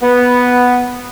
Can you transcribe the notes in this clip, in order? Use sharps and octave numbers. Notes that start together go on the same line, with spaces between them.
B3